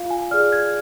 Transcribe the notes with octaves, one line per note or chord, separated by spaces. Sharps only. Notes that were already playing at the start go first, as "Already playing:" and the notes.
Already playing: F4 F5
G#5
G#4 D5 F6
G#6